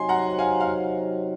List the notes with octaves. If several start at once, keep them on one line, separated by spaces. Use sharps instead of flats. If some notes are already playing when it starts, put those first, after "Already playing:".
Already playing: C3 F#3 C4 D#4 G#5 C6
F#5 A#5
F5 G#5
F5